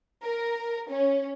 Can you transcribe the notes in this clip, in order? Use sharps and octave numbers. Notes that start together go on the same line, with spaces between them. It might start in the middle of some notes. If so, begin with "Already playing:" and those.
A#4
C#4